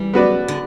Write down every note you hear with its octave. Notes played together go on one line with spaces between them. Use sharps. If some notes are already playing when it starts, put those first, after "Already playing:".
Already playing: E3 G3
B3 F#4 B4 D5
D3